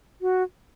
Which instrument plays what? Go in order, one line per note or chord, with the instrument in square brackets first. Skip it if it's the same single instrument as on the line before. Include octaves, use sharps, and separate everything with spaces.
[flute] F#4